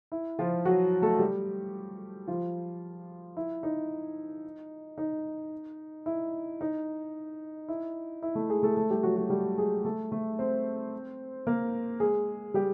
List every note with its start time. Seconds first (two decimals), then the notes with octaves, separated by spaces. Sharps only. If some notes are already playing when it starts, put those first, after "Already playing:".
0.12 E4
0.39 F3 F4
0.65 F#3 F#4
1.02 A3 A4
1.19 G3 G4
2.28 F3 F4
3.37 E4
3.63 D#4
4.98 D#4
6.06 E4
6.61 D#4
7.68 E4
8.23 E4
8.35 A3 A4
8.50 G#3 G#4
8.63 A3 A4
8.77 A3 A4
8.91 G3 G4
9.03 F#3 F#4
9.16 F#3 F#4
9.30 G3 G4
9.58 G#3 G#4
9.84 A3 A4
10.11 A3 A4
10.39 C4 C5
11.47 A#3 A#4
12.00 G#3 G#4
12.54 G3 G4